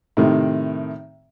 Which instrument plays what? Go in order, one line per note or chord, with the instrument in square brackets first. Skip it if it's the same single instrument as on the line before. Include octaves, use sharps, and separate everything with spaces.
[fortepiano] A2 C3 D#3